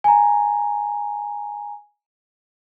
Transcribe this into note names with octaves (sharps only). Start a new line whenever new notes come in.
G#5 A#5